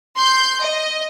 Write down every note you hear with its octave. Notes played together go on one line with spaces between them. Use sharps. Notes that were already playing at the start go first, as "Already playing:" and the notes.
C6 G6
D#5